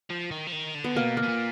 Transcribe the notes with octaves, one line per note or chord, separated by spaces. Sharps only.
F3
D#3
F3
D#3
D3
B3
B2 A#3
A#3
B2
A#2